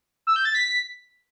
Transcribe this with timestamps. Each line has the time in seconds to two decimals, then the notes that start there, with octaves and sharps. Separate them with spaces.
0.27 E6
0.36 G6
0.45 A6
0.54 B6